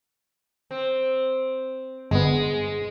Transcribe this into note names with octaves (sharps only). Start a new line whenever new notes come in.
C4
G1 G#3 B3